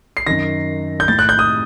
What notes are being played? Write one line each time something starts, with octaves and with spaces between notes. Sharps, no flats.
C7
F#2 D#3 A#6
G6
A2 A6
F#6
G6
D#6